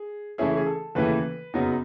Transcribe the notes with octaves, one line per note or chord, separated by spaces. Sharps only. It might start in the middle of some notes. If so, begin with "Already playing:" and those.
Already playing: G#4
C#3 E3 A3 C#4 E4 G#4
G#4
A4
D#2 C#3 E3 A3 B4
F#2 C#3 F#3 B3 D#4